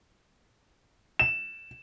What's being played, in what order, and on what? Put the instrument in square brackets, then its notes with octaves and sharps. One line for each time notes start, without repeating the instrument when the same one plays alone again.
[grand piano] E7